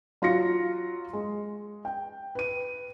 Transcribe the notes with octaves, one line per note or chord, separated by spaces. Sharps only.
F#3 F4 F#4 A#6 C#7
G#3
G5
B4 D#7